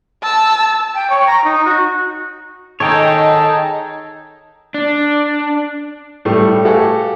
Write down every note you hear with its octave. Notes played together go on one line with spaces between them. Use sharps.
A5 E6
G5
C#5
A#5
D#4
F#4
D#3 D#4 G#4 A4 C#5 G5 A5
D4
A2 G3 A3
F#4 G4 A4 F5 F#5 G#5